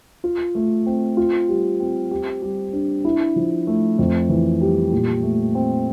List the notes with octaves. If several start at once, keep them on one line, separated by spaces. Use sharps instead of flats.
F4
A3
C4
F4
G3
C4
G4
G3
D4
E4
F3
A3
F2
E3
G3
A#2
A3
C4